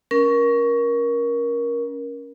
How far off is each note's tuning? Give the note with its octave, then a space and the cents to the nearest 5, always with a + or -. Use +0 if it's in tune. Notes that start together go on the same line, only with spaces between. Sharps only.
C#4 +10 A#4 +20